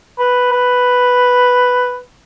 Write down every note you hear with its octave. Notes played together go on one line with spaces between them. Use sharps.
B4
B4